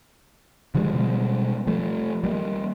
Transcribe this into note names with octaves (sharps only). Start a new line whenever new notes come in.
D3 F3 G3 G#3
B2 G3 G#3
F3 A3
G3 A#3